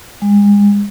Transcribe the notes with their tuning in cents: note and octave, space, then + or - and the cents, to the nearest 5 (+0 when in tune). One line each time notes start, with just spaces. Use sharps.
G#3 -35